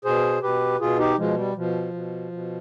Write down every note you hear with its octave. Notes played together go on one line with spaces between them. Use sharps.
B2 G#4 C5
B2 G4 B4
B2 F4 G#4
D#4 G4
B2 F3 G#3
G3
B2 F3
B2
B2